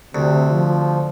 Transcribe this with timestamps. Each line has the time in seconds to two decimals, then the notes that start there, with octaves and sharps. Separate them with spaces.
0.15 D2 C3
0.51 F3